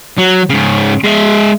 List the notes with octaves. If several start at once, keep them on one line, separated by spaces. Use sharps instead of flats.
F#3
G#2 C#3
G#3 E5